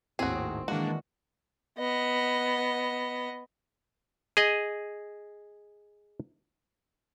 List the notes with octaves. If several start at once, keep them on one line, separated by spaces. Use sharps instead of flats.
G#1 D#2 A2 C4 F#4 G#4
D#3 E3 G#3 A#3 D4 F#4
B3 D#5
G#4 D#5